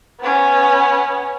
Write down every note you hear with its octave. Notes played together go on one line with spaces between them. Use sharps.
B3 C#4